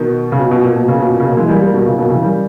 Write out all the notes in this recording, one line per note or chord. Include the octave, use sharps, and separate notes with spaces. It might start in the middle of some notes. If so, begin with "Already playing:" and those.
Already playing: B2 D#3
C#3
B2
B2
A#2
B2
A#2 C#3
B2
A#2
C#3
B2
A#3
E3 G#3
G3 A#3
G3 A#3
B2 D#3
A#2 C#3
B2 D#3
C#3 E3
D#3 G3